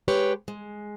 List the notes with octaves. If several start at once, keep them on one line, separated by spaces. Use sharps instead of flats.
G#3 G4 B4 C#5
G#3